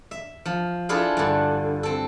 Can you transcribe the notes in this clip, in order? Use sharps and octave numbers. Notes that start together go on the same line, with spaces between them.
E5
F3
D4 E4 F4 G#4 A4
G2 D3
C4 A4